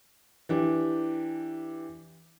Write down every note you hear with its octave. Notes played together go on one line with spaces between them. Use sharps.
E3 D4 G4